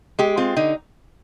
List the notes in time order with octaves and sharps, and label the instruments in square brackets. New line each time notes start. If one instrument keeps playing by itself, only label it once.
[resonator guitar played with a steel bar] G#3 G4
C4 F4
D3 D#4